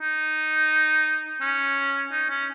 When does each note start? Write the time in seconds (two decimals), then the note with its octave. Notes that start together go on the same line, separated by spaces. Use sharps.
0.01 D#4
1.41 C#4
2.12 D#4
2.29 C#4